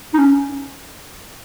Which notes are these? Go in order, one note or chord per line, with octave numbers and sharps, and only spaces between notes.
D#4
C#4